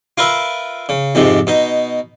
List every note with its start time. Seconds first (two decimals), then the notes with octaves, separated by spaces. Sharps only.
0.18 F4 A#4 B4 E5
0.89 C#3
1.15 F2 G#2 C3
1.47 B2 D#4